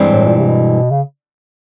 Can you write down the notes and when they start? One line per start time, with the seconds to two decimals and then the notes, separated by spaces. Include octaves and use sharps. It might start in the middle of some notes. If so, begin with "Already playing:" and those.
Already playing: G2 E3 G#3 C4
0.09 A2
0.27 A#2
0.38 C3
0.45 B2
0.91 C#3